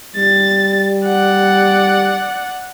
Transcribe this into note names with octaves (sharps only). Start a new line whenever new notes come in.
G3 A6
D5 F#5